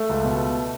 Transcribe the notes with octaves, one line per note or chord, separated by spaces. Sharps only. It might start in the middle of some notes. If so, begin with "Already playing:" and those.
Already playing: A3 A4
C#2
B2